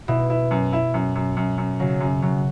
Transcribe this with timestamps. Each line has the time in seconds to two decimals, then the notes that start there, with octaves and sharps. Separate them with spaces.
0.08 B2 E4
0.30 E4
0.51 F#2
0.73 E4
0.94 F#2
1.15 F#2
1.37 F#2
1.58 F#2
1.80 C#3 F#3
2.00 F#2
2.22 F#2 F#3